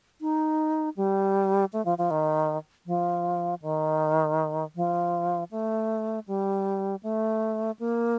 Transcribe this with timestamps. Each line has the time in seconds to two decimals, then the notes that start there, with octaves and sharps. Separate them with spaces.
0.21 D#4
0.97 G3
1.73 A3
1.85 F3
1.98 F3
2.11 D#3
2.86 F3
3.62 D#3
4.76 F3
5.51 A3
6.28 G3
7.03 A3
7.79 A#3